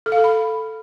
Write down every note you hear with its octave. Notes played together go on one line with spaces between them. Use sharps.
A4
F5
A4
B5